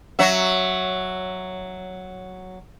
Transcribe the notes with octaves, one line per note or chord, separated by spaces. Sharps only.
F#3 F#4 E5